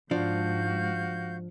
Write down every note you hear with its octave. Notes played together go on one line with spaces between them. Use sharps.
G#2 F3 D4 F#4 F5 G6